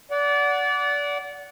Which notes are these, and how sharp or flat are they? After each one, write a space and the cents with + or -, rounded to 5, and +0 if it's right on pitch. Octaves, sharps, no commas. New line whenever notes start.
D5 -25 F#5 +0